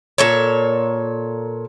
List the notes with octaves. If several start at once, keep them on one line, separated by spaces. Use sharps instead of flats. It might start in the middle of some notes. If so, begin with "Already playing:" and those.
A#2 A4 C#5